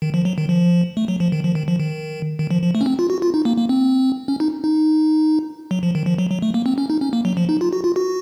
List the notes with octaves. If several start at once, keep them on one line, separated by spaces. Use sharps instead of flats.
D#3
F3
F#3
D#3
F3
A3
F#3
F3
D#3
F3
D#3
F3
D#3
D#3
F3
F3
A3
C#4
C4
F4
F#4
F4
D#4
A#3
A#3
C4
C#4
D#4
D#4
F#3
F3
D#3
F3
F#3
F#3
A3
A#3
C4
C#4
D#4
C#4
A#3
F#3
F3
D#4
F4
F#4
F4
F#4